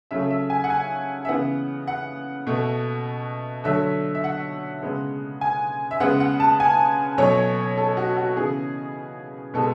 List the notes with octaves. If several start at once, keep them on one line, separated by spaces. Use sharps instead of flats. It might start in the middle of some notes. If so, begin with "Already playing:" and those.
C#3 F#3 A3 E5
E5
G#5
F#5
G#5
E5
C#3 E3 B3 F#5
F#5
B2 A3
D3 F#3 A3 E5
E5
F#5
C#3 G#3 B3
G#5
E5
C#3 G#3 B3 F#5
F#5
A5
G#5
B2 F#3 A3 C#5
A4
F#4
F#4
C#3 E3 B3 G#4
B2 G#3 B3 A4